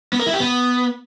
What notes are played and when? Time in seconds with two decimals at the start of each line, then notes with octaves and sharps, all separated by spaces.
0.13 B3
0.20 A#4
0.26 E4
0.33 G4
0.40 B3